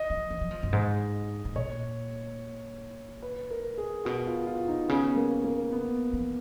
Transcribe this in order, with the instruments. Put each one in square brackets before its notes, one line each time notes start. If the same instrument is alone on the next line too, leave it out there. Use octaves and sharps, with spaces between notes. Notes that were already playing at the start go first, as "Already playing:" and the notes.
Already playing: [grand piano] D#5
[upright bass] F3
F3
F#3
F3
F#2
G#2
G#2
[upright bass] A#2 [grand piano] C#5
[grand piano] B4
A#4
G#4
[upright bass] B2 [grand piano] F#4
[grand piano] F#4
F4
F4
D#4
[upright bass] C#3 [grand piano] B3
[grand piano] A#3
A#3
B3
[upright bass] F3